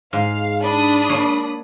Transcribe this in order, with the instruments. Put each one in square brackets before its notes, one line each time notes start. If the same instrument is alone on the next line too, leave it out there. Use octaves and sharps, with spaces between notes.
[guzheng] G#2 [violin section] F5
[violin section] D4 B5 D#6
[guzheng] A#3 C#5